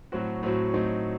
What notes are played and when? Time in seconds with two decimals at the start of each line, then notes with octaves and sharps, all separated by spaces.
0.12 A2 F#3 C4 F#4
0.43 A2 F#3 C4 F#4
0.73 A2 F#3 C4 D#4